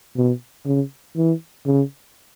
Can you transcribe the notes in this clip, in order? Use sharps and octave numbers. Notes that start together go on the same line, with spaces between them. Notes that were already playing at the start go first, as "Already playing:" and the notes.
B2
C#3
E3
C#3